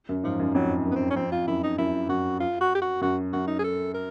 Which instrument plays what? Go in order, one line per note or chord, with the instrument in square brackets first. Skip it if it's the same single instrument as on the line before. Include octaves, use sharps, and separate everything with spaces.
[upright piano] F#2
[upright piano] G#2 [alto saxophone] F3
[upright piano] F#2
[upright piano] F2 [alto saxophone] F#3
[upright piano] F#2
[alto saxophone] B3
C4
C#4
[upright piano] F2 [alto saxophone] C4
[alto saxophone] F4
[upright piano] F#2 [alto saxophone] E4
[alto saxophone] D#4
[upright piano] F#2 [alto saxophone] E4
[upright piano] F#2 [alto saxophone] F#4
[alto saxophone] F4
F#4
G4
F#4
[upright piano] F#2 [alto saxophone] F#4
[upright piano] F#2 [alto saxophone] F#4
[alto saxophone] D#4
G#4
A4
A#4